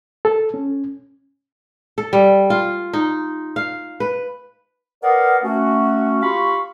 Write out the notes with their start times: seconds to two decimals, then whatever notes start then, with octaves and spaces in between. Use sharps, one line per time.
0.25 A4
0.54 C#4
1.98 A4
2.13 G3
2.50 F4
2.93 D#4
3.56 F5
4.00 B4
5.03 A#4 B4 D5 D#5 F5 F#5
5.43 A3 C#4 F#4
6.22 F4 G4 F5 B5 C#6